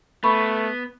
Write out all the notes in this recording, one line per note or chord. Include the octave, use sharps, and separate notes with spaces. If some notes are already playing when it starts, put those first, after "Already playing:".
A3 B3 B5 C#6